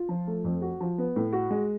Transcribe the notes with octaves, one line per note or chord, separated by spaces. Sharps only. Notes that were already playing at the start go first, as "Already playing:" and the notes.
Already playing: F4
F3
A3
F2
F#4
F3
B3
A2
F#4
G#3